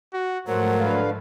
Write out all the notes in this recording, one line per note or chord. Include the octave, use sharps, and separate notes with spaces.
F#4
G#2 F3 F#3 A3 A#4 C5 F#5
D3 B4 F5